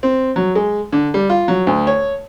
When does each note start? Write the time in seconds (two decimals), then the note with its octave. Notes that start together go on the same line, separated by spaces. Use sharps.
0.03 C4
0.36 F#3
0.55 G#3
0.93 D3
1.14 G3
1.30 F4
1.48 F#3
1.67 D2
1.87 C#5